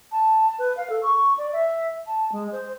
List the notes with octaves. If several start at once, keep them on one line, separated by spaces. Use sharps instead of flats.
A5
B4
F5
A4
C#6
D5
E5
A5
G#3
C5